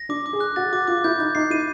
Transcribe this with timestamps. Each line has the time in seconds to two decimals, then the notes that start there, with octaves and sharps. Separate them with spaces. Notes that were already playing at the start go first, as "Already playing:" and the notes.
Already playing: A#6
0.09 D4 D6
0.26 D6
0.33 G#4
0.40 F#6
0.56 F#4 A6
0.73 F#4 D6
0.87 F4 D6
1.04 E4 G6
1.19 D#4 G6
1.35 D#4 C7
1.50 E4 D#7